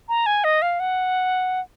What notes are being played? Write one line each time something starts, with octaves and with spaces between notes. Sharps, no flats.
A#5
G#5
D#5
F5
F#5